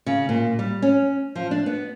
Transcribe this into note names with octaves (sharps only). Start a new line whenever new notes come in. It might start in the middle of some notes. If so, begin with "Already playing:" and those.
C#3
A#2
G3
C#4
F3
D4
B3